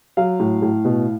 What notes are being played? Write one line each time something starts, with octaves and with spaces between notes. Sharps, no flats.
F#3 F5
A2
A2
B2